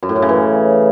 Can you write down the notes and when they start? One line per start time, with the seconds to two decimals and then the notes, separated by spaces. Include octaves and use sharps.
0.03 F#2
0.09 A2
0.16 F#2
0.22 C#3
0.29 E3